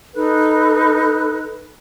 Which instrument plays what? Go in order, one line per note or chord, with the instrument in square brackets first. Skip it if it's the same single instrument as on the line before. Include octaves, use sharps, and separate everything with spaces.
[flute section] D#4 A4 B4 F#6